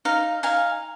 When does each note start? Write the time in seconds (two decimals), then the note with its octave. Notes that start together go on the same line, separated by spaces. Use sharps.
0.05 D#4 F5
0.43 D#4 F5 G#5